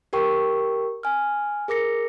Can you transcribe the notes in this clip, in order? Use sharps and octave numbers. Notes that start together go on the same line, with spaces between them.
G4 A#4 G5 C#6
G#5 F6
G#4 A#4 D6 A#6 C#7